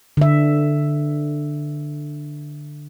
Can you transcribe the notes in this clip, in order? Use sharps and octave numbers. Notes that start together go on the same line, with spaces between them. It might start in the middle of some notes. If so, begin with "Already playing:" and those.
D3 E5